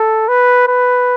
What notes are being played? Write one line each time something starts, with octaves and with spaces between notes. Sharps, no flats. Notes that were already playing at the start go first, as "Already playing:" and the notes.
Already playing: A4
B4
B4